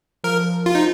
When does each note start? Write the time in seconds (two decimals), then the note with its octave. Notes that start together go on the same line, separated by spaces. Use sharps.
0.24 F3 A#4
0.66 F4
0.75 D#4